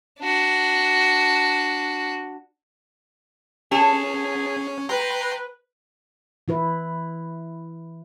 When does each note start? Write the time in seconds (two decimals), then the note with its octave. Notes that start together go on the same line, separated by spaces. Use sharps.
0.20 D4 F#4
3.72 C#4 G#4 A4
4.89 B4 G5 A#5 C6
6.48 E3 E4 B4